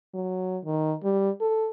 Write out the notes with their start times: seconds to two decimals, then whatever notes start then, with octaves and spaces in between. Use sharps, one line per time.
0.14 F#3
0.65 D#3
1.03 G3
1.41 A4